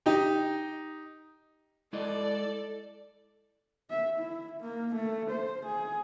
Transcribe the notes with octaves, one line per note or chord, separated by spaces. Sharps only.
D#4 G4
G#3 E4 A4 D5 D#5
E5
E4
A#3
A3
C5
G#4